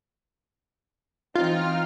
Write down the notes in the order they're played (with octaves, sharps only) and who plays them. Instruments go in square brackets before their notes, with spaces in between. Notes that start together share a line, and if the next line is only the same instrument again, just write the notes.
[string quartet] E3 C4 D#4 [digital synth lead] F4